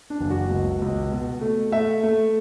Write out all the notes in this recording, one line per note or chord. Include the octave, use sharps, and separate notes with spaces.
D4
F#1
F#4
C#2
C#2
B2
A3
A3 E5
A3